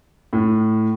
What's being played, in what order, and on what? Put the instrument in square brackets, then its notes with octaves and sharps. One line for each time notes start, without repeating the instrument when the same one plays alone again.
[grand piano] A2